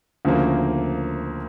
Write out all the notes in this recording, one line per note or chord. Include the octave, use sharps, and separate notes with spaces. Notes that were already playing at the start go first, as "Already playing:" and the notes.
D2 C#3 F3 A#3